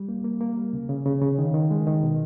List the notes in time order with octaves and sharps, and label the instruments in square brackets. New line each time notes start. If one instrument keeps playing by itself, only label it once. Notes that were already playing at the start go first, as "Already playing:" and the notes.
Already playing: [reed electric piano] G3
A#3
A#3
A#3
G3
C#3
C#3
C#3
C#3
D#3
D#3
G#3
D#3
B2